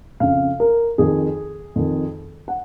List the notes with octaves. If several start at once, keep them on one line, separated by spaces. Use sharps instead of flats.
F2 C#3 F5
A#4
F2 D#3 G#4
F2 D#3
F#5